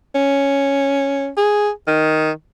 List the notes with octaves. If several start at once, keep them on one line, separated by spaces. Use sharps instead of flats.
C#4
G#4
D#3